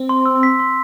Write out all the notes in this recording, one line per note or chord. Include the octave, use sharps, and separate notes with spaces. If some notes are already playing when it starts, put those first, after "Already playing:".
Already playing: C4
C6
E6
B6
C6